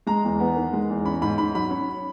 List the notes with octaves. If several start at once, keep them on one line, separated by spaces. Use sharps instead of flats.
G#3 A#5
E2
B3
D#3
G#3
E2
C#4 B5
G#2 B5
G#2 B5
F#3 B5
C#4